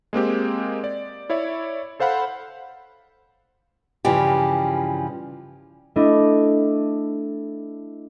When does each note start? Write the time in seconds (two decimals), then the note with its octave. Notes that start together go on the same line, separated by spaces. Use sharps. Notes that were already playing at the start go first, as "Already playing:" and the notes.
0.13 G#3 A#3 C4 G4
0.84 D5
1.30 E4 C#5 D5 E5
2.00 A4 C5 F5 F#5 B5
4.05 G2 C#3 E3 F3 G4
5.96 A3 D4 E4 D#5